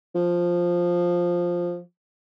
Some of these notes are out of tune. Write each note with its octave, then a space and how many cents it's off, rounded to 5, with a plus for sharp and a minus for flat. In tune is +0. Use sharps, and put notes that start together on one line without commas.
F3 +5